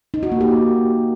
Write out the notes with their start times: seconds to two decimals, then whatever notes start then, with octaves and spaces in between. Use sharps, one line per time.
0.14 D#4
0.23 F#4
0.32 A#3
0.41 G4